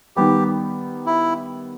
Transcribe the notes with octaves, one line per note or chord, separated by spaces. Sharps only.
D#3 G3 B3 G4
E4